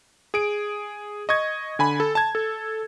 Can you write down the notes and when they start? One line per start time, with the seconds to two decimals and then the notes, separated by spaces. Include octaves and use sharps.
0.34 G#4 D7
1.29 D#5 C#6 G#6
1.79 D3 G#5 B5
2.00 A4
2.15 A5 G#6
2.35 A4